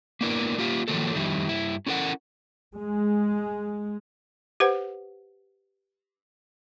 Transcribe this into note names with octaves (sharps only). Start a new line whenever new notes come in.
A#3 B3 D4 E4 A#4
A#3 F4 G4 F5
D#3 F3 F#3 A#3 A4
F2 D#3 G3 E4
G2 E4
C#4 E4 A4 A#4 F#5
G#3
G4 B4 C5 F#5